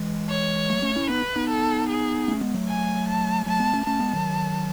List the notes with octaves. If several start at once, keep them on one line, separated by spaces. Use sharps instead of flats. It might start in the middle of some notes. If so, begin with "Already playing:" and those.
Already playing: E3 G#3
C#5
F#3 A3
A3 C#4
C#4 E4
B3 D#4 B4
B3 D#4
A4
G#4
A3 C#4
G#3 B3
F#3 A3
G#5
A5
F#3 A3 A5
G#3 B3
A3 C#4
A3 C#4 A5
G#3 B3
D#3 F#3